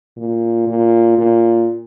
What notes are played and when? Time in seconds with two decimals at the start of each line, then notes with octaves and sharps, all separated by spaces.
0.17 A#2
0.67 A#2
1.18 A#2